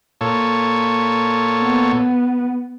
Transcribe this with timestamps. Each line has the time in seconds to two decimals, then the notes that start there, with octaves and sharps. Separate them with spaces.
0.21 A#2 A4 C#5
1.60 B3